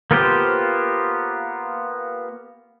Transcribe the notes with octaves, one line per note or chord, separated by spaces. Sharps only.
A#3 B3 F4 G4 C5